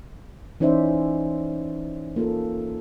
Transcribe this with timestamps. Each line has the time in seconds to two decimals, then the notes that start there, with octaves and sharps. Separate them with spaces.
0.60 E3 C#4 D#4 C5 D5 E5
2.16 A#3 F4 A4